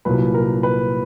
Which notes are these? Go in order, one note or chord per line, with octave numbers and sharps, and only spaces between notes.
C2 A#2 F#3 B4
A#4
B4